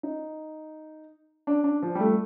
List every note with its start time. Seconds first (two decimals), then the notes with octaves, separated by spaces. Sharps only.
0.03 D#4
1.47 D4
1.64 D4
1.82 F3
1.95 G3
2.00 A3